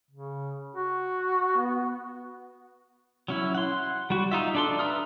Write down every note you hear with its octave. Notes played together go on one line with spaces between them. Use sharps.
C#3
F#4
B3
F#3 C#4 E4
F#5 C6
G3 F#4
D#4 F4 E5
D4 A4 C6
B4 E5 A#5 D#6 F6